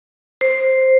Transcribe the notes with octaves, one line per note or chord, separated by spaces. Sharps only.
C5